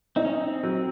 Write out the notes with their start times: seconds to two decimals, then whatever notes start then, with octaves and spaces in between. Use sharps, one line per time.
0.16 C4 D#4
0.25 C#4
0.35 C4
0.63 F#3